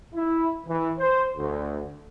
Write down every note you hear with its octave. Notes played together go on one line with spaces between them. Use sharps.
E4
E3
C5
D2